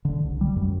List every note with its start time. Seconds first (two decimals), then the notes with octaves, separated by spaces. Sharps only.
0.05 D3
0.24 C2
0.41 G3
0.56 F#2